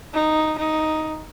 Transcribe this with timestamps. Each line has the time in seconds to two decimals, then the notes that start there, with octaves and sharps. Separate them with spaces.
0.14 D#4
0.59 D#4